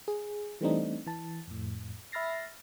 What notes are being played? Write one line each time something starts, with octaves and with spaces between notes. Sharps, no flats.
G#4
E3 G3 A3 C4 D4 D#4
E3 A5
F2 A2
E5 B5 F6 A6 A#6 C7